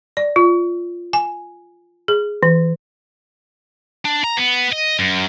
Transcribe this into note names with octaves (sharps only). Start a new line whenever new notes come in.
D5
F4
G#5
G#4
E3
D4
A#5
B3
D#5
F#2